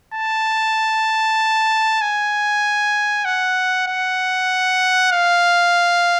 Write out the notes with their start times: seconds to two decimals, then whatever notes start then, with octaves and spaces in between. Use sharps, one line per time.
0.14 A5
2.01 G#5
3.25 F#5
3.88 F#5
5.12 F5